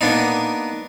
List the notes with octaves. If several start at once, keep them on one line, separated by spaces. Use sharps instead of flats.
A#3 B3 D4 D#4